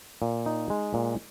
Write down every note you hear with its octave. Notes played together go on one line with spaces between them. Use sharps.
A#2
D#4
G#3
A#2